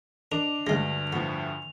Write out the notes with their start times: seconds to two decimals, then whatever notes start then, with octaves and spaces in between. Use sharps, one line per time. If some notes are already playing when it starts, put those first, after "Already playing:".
0.32 D4 A#4 D#5 D6 F7
0.67 D2 G2 G3 G#3 A#6
1.13 A2 F3 B3